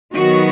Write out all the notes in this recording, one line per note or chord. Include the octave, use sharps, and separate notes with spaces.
D#3 F#3 B3 D#4 F#4